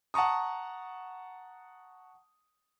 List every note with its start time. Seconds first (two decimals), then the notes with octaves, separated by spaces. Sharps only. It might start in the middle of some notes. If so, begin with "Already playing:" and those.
0.14 F#5 A5 A#5 C#6 D#6